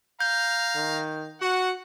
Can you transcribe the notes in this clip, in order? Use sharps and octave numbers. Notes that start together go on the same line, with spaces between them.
F5 A#5 G6
D#3
F#4 F#5